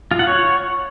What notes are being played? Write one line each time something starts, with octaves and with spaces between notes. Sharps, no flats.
F4
F#5
C#5